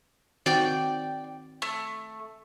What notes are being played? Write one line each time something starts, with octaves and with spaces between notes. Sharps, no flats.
D#3 C4 F#4 D5 G5 G6
A3